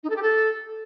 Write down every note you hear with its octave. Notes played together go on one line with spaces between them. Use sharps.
D#4
A4
G4
A4